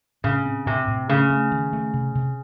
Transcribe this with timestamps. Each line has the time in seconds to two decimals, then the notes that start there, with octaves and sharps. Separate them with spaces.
0.24 A2 C#3
0.46 C4
0.66 A2 C3
0.88 A2
1.09 C#3 A3
1.30 A3
1.52 D#3
1.73 A3
1.94 C3
2.15 C3